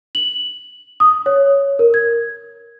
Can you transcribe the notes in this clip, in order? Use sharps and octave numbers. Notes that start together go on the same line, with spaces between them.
F#7
D#6
C#5
A#4
G#6